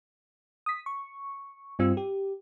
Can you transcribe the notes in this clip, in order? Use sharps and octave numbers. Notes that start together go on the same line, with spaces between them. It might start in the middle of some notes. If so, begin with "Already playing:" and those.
D#6 B6
C#6
G2 G3 C4 F4 E6
G4